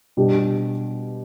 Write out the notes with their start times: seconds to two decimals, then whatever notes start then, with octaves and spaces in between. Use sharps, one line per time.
0.17 B2 G3 D4 G4